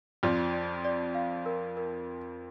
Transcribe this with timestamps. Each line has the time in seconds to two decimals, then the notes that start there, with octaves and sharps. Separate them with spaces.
0.23 F2 F3 D5
0.53 D5
0.84 D5
1.15 F5
1.46 A#4
1.77 A#4